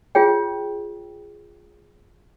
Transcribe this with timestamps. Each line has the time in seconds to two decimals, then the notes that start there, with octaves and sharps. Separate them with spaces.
0.15 F4 G#4 C#5 G5